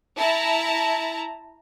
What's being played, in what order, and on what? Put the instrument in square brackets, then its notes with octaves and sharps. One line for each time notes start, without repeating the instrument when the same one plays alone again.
[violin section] E4 A5 A#5